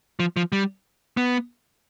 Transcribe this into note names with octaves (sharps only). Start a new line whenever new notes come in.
F3
F3
G3
B3